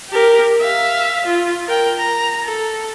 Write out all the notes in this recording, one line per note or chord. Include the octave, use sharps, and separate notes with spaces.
G4 A#4
E5 F5
F4
A#4 G5
A#5
A4